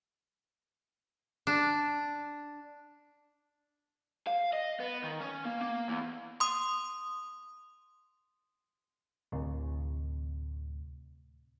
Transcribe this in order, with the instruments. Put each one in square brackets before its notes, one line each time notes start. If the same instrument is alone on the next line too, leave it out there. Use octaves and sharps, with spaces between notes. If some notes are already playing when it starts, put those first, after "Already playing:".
[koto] D4
[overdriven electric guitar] F5
D#5
B3
D#3
C#4
A#3
A#3
E2
[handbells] C6 D#6
[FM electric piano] D2 A2 C3